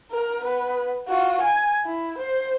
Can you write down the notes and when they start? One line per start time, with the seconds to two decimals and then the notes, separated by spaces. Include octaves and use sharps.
0.11 A#4
0.41 B3 B4
1.08 F4 F#4
1.41 G#5
1.85 E4
2.18 C5